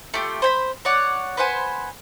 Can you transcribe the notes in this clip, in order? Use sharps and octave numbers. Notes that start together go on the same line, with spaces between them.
A3 F4 G4
C5 G#5 B5
C#5 D5 F#5
B4 C5 F#5 G#5